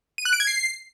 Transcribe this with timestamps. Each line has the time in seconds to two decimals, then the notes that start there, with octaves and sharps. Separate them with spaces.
0.18 D#7
0.25 F#6
0.33 D7
0.40 G#6
0.47 C7